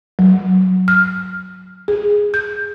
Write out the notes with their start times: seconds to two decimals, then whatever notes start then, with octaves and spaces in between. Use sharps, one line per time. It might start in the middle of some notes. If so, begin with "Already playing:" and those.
0.19 F#3
0.88 F6
1.88 G#4
2.34 G6